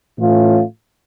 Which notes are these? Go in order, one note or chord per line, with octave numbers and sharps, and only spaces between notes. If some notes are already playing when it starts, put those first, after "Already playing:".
A2 E3 A3 C#4 F4